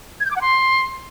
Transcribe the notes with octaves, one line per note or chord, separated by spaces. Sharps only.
G#6
G6
D6
F#5
C6